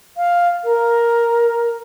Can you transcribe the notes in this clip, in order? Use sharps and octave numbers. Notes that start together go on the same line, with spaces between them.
F5
A#4